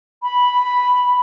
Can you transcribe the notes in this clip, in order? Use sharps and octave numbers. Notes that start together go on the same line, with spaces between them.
B5